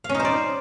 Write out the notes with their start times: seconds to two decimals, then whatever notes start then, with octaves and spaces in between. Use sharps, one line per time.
0.04 F5
0.09 C#4
0.15 D#4
0.20 C5
0.25 D5